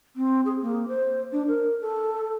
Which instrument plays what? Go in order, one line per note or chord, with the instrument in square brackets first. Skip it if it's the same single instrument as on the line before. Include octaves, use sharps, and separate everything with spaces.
[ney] C4
G#4
A#3
C5
D4
A#4
A4